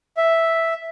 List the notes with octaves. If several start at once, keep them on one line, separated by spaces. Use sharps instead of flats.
E5